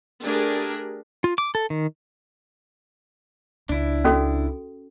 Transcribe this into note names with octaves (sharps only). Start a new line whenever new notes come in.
A3 D4 G4 G#4 A#4
F4
D6
A4
D#3
C#2 D4 E4
C#4 F#4 A4